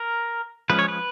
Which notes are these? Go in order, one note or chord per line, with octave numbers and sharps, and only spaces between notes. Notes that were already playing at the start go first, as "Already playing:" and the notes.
Already playing: A#4
F3 G#3 C#4 B4
C#5
B4